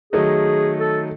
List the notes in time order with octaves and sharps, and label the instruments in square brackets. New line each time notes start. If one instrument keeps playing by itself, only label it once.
[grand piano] D#3 F#3 A3 D#4 [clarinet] G#4
[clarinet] A4